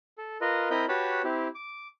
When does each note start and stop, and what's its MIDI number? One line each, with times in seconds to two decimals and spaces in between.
0.18 0.38 69
0.41 0.69 65
0.41 0.69 70
0.41 0.69 71
0.41 0.69 75
0.70 0.85 60
0.70 0.85 64
0.70 0.85 70
0.70 0.85 75
0.70 0.85 83
0.70 0.85 91
0.89 1.22 66
0.89 1.22 67
0.89 1.22 71
0.89 1.22 73
0.89 1.22 81
0.89 1.22 83
1.24 1.48 60
1.24 1.48 64
1.24 1.48 67
1.55 1.87 86